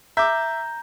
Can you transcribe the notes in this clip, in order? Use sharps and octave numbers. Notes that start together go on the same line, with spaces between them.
E5 A#5 D6 G6